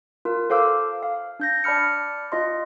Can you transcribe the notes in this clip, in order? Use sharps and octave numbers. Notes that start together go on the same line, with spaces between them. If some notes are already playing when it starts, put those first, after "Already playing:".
F4 A#4
A4 C5 F5 D6 E6
F5
D4 G6 A#6
D5 A5 B5 F6 C#7
F4 D#5 C6